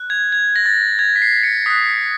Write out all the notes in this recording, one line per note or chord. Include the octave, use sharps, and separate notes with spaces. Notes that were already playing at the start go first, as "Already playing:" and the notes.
Already playing: F#6
G#6
G#6
A#6
A6
G#6
B6
C7
C#7
D#6 F#6 B6